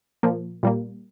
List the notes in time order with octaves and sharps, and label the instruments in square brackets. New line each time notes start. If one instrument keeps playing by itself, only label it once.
[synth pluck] A#2 F3 A#3
A#2 G3 A#3